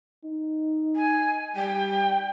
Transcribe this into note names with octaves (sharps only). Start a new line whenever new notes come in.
D#4
G#5
G3 G5